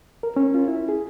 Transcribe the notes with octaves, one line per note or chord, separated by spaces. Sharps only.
A#4
C#4
F4
E4
G#4